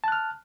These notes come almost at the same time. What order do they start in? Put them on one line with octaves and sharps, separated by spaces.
A5 F#6 F6